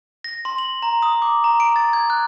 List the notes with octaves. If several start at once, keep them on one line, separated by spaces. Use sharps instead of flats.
A#6
C6
F#7
A#5
D#6
D6
A#5
D7
A6
G#6
F#6